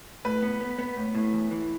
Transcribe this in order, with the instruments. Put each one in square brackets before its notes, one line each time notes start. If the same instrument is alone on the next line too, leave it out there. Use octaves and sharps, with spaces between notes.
[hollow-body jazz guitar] A2 [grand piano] B4
[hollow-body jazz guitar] B3
B3
B3
A2
A2
E2
E3